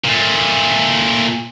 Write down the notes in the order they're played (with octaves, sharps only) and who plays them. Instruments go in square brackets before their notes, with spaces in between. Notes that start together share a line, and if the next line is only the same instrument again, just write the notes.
[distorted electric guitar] A#2 A3